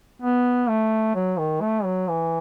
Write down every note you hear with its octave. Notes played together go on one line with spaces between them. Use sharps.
B3
A3
F#3
D#3
A3
F#3
E3